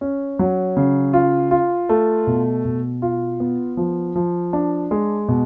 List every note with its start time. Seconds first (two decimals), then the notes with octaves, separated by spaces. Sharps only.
0.01 C#4
0.39 F#3
0.77 C#3
1.13 F4
1.51 F4
1.89 A3
2.27 B2
2.65 B2
3.02 F4
3.40 B3
3.77 F3
4.16 F3
4.53 D4
4.91 G#3
5.28 B2